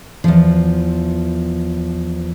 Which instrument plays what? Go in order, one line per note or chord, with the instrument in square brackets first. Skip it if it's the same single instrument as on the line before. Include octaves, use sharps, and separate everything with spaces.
[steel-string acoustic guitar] E2 F3